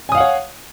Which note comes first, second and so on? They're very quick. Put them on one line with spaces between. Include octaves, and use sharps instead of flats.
G#5 D#6 F5 F#5 C#5